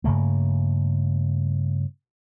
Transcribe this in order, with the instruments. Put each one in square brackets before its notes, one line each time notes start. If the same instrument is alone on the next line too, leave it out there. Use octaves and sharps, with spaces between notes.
[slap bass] G2 C#3 A3 A#3